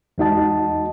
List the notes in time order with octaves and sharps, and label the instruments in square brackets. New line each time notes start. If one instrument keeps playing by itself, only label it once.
[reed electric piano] E2 G#3 D#4 F#4 D#5 A5